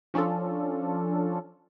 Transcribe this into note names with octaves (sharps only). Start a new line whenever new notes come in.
F3 C#4 D4 F4 A4